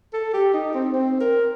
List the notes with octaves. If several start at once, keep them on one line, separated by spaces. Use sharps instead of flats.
A4
G4
D#4
C4
C4
A#4